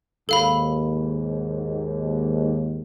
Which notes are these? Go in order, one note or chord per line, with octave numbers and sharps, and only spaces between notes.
D#2 G#2 A4 F5 B5